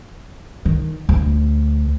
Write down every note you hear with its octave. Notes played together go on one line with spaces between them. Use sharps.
D#3
D2